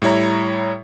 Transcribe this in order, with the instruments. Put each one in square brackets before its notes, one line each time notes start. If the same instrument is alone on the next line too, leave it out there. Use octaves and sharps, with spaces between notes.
[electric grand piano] A2 G3 E4 C#5 A#5